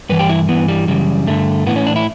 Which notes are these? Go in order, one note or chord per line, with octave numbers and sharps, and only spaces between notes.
G2 E3 B4
G4
E4
G2 E3 B3
G3
F#2 C#3 E3 G3
G2 D3 A3
A2 E3 B3
C#4
D4
E4